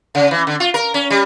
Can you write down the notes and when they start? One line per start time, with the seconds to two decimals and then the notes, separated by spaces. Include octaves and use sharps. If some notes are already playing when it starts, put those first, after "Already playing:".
0.15 C#3
0.31 E3
0.47 D3
0.60 F4
0.74 A#4
0.94 C#4
1.10 G3